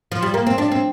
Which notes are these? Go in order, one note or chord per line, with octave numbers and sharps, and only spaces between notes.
F3
G3
A#3
C4
D4
C4